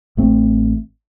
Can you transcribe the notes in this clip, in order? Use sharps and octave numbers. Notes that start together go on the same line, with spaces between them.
A1 A3 C4